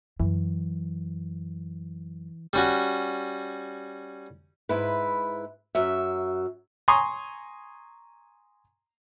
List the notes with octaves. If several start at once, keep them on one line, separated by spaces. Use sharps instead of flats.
F#2 E3
G3 C#4 F#4
G#2 E4 B4
F#2 F#3 E5
G#5 A#5 C6 C#6 D#6